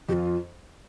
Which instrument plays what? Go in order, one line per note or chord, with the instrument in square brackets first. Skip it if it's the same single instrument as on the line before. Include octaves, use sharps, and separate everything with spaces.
[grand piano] F2 [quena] G4
[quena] F4